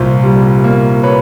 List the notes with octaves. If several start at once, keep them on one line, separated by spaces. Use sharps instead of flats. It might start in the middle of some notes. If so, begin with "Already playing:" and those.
Already playing: C2 A#2 C5
G3
A#3
B4 C#5